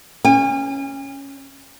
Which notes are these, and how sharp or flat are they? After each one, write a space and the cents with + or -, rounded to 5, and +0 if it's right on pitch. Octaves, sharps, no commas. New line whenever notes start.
C#4 +0 G#5 -45